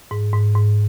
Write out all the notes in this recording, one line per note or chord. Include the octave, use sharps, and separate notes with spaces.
G#2
G#2
G#2